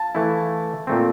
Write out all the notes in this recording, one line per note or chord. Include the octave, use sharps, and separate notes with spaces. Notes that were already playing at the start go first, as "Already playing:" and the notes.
Already playing: F5 A5
E3 A3 E4
A#2 A3 C4